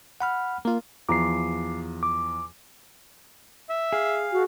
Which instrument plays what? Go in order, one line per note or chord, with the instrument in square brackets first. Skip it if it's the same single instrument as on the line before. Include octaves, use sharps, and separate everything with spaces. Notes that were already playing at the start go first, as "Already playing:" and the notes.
[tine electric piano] F#5 B5 F6
[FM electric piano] A#3 F4
[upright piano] E2 F3 A#5 [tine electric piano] D6 C7
[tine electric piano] D6
[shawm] E5
[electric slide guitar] G#4 [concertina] F5
[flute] F#4